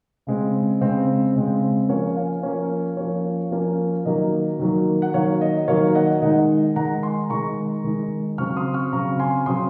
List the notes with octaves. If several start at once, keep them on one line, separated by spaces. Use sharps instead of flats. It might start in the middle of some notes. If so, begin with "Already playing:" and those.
C#3 G#3 C4
C#3 G#3 C4
C#3 G#3 C4
F3 A#3 C#4 C#5 F5
F5 G#5
F3 A#3 C#4 C#5
F3 A#3 C#4 C#5
F3 A#3 C#4
D#3 F#3 A#3 D#5
D#3 F#3 A#3
F#5
D#3 F#3 A#3 C#5 F5
D#5
D#3 F#3 A#3 C#5 F5
D#5 F#5
D#3 G#3 D#4 D#5 F#5
D#3 G#3 D#4 F#5 A#5
G#5 C6
D#3 G#3 D#4 A#5 C#6
D#3 G#3 D#4
C#3 F#3 C4 C#6 F6
C6 D#6
C#6 F6
C#3 F#3 C4 A#5 C#6
G#5 C6
C#3 F#3 C4 C6 D#6